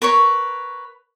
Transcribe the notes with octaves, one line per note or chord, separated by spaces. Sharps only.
A#4 B4 C#5 C#6